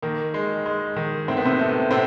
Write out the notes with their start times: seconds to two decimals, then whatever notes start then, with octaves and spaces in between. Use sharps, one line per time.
0.02 D#3 A#3
0.34 G#3
0.66 G#3
0.96 D#3
1.28 A2 C4
1.37 B3
1.45 C3 C4
1.59 A3
1.91 A2 C3 C4